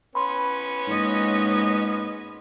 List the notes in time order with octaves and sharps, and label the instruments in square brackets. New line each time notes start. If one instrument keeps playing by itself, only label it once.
[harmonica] B3 C#4 [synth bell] B5 C6
[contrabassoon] G#2 [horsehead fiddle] A#3 D#5